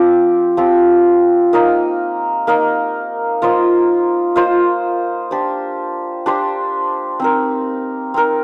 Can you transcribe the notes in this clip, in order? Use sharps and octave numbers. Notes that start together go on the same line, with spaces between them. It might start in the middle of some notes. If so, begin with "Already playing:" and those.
Already playing: F3 C4 G4
F3 C4 G4
A#3 D#4 A#4 D#5
A#3 D#4 A#4 D#5
A#3 F4 C5 D#5
A#3 F4 C5 D#5
D4 G4 C5
D4 G4 C5
C4 D#4 A#4
C4 D#4 A#4